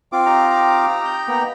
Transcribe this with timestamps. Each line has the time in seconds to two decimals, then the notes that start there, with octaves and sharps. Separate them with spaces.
0.12 C4 F4 D6
0.26 D#4 G4 A#5
1.05 G6
1.28 A#3 B3 G5